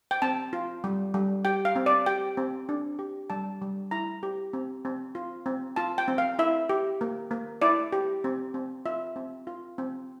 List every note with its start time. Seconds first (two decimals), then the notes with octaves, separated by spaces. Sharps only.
0.11 G5
0.22 C4 A5
0.53 F4
0.84 G3
1.14 G3
1.45 G4 G5
1.65 F5
1.76 C4
1.86 D5
2.06 G4 G5
2.37 C4
2.69 D4
2.99 G4
3.30 G3 A5
3.62 G3
3.91 E4 A#5
4.23 G4
4.53 C4
4.85 C4
5.15 F4
5.46 C4
5.76 F4 A5
5.98 G5
6.08 C4
6.18 F5
6.39 E4 E5
6.69 G4
7.01 A#3
7.31 A#3
7.62 E4 D5
7.93 G4
8.24 C4
8.54 C4
8.86 F4 E5
9.16 C4
9.47 F4
9.78 C4